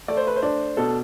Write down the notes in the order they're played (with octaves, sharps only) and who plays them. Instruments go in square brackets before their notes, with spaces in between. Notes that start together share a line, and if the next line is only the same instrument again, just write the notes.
[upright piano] A3 [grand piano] D5
[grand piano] C5
B4
C5
[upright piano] D4
[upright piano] B2 [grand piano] A4